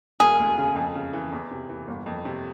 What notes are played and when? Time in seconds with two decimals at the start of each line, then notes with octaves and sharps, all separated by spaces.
0.20 E1 G#4
0.39 D2
0.58 C#3
0.76 F2
0.95 C#3
1.13 E3
1.32 E2
1.51 C3
1.69 E3
1.88 G1
2.06 F2
2.25 C3